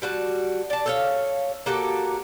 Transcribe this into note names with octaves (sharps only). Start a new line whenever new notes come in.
G3 F#4 A5
D5 A5
A4 C#5 F5
A#3 F#4 G4 A4